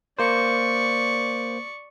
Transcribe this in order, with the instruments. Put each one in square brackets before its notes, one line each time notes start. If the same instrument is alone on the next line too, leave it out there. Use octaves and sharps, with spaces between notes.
[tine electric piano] A#3 C5 [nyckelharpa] D5 C#6